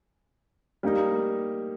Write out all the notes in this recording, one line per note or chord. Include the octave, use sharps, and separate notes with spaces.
G3 A#3 D#4